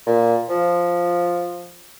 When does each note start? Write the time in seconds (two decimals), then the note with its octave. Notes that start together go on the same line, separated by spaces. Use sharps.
0.07 A#2
0.50 F3